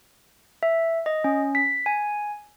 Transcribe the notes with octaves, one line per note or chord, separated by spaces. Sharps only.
E5
D#5
C#4
B6
G#5